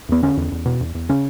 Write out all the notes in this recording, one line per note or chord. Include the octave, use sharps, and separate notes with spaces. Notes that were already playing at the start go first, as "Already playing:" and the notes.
E2 B3
D3 C#4
E2
E2
B2
E2
E2
C#3 C#4